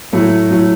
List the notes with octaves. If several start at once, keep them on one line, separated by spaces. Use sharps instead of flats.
A2 F#3 A3
A2 F#3 A3